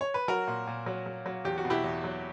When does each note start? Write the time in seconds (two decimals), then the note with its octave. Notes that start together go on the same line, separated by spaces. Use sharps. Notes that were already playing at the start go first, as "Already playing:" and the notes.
0.01 C#5
0.14 B4
0.28 F#3 F#4 A#4
0.47 A#2
0.67 A#2
0.86 F#3
1.06 F#3
1.26 F#3
1.45 E2 G4
1.58 F#4
1.65 B2
1.70 E4 G4
1.84 E2
2.04 F#3